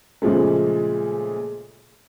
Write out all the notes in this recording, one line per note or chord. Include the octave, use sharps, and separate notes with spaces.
A#2 C#3 F3 G#3 A3